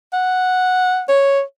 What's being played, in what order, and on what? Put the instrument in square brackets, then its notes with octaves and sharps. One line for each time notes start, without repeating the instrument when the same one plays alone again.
[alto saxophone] F#5
C#5